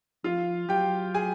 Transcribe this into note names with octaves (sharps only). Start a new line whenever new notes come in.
F3 F4 F5
F#3 G4 G5
G#4 G#5